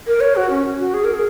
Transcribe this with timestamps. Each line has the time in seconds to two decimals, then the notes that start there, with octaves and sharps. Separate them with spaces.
0.07 A#4
0.20 C#5
0.36 F#4
0.50 C#4
0.79 F#4
0.94 G#4
1.04 A#4
1.14 G#4